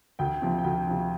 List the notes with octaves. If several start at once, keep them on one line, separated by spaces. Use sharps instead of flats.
D2 G5
C3 F3
G5
D2 F#5
C3 F3